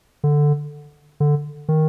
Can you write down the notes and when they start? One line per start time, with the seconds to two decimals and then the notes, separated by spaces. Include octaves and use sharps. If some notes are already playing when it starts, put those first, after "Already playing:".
0.24 D3
1.20 D3
1.69 D#3